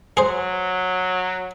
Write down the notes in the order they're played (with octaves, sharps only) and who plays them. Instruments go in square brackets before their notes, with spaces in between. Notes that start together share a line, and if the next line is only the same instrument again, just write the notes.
[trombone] F#3 [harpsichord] G#4 C5